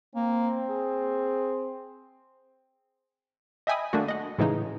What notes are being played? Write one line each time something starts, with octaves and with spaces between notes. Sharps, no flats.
A#3 C4
G#4
D#5 E5 G5 G#5 B5 D#6
D3 A3 A#3 F#4
D#5 F#5
A2 C#3 E3 G#3 D#4